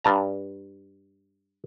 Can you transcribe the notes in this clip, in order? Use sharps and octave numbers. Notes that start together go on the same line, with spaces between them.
G2 A5 A#5